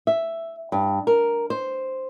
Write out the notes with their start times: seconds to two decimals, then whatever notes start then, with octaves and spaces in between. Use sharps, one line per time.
0.07 E5
0.72 G2
1.07 A#4
1.50 C5